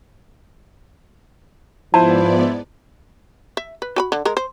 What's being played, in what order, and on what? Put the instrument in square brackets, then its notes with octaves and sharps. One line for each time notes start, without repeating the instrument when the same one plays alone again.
[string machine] G#2 B3 D5 [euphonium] F3 [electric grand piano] E4 C5 [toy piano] A5
[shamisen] E5
B4
F#4 G#5 B5
D3
G#3 A#4
C5